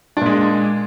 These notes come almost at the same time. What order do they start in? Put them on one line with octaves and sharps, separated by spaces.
D4 A#2 G#3